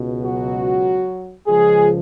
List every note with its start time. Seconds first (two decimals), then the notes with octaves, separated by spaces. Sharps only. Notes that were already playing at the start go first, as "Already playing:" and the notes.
Already playing: C#2 B2
0.22 F#3 F#4
1.47 C#2 C#3 F3 G#3 G#4